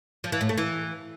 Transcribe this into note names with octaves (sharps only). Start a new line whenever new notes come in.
F3
E3
A2
A3
E3